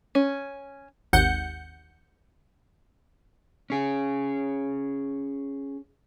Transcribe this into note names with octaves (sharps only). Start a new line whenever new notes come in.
C#4
G#1 D#2 F#5 G6 C#7
C#4 G#4